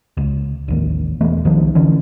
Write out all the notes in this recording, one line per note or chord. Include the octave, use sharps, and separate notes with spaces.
C#2
A1 D#2
E1 E3 A3 B3
C2 D#3 F3 F#3
D3 E3 C#4